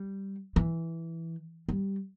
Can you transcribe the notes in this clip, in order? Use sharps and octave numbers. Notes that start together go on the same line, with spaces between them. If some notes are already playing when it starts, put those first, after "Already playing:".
Already playing: G3
E3
G3